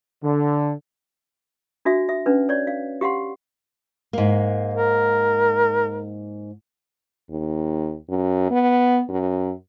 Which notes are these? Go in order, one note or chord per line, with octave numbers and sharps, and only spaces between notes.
D3
D4 F#4 E5
E5
C#4 D4 B4
C#5 D5
F5
G4 F5 F#5 C6
G#2 A#3
A#4
D#2
F#2
B3
F#2